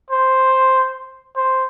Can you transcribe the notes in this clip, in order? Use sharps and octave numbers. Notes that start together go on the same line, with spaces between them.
C5
C5